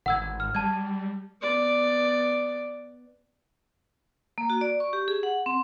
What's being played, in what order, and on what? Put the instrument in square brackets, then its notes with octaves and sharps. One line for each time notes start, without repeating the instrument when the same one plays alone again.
[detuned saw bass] G#1 [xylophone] F#5 E6 G#6
[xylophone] F6
[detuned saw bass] G3 [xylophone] A5 G#6
[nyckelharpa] B3 D5
[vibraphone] A#3
F#4
D5
C#6
G4
G#4
F#5
C4